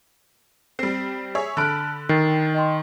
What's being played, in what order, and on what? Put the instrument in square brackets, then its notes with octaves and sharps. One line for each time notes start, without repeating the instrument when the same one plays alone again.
[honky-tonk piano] G3 C4 [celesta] C7
[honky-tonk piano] G#4 C#5 E5
[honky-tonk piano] D3 B5 D7 [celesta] A5 F6 F#6
[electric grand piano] D#3 [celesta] G5 A6 C7
[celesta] D#5 G5 C6